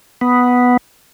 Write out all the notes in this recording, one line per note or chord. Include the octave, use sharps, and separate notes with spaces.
B3